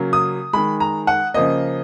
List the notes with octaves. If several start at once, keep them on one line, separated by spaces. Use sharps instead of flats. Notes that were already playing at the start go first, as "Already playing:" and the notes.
Already playing: C#3 F#3 A#3
D#6
D#3 G#3 B5
A#5
F#5
C#3 F3 A#3 D#5